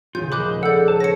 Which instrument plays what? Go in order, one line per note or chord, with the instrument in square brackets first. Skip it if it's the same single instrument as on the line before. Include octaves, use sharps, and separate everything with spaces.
[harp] D#1 C#3 [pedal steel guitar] F4 [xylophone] G6
[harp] A#2 F3 [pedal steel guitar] C5 D#5 B5 [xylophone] D6 F#6 G6
[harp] C#3 G#3
[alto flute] A4 [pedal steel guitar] D5 F#5 [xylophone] E6 G6
[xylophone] C5 [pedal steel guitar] A5
[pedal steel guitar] C#4 A5 [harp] B4 [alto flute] C#5 [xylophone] A#6 C#7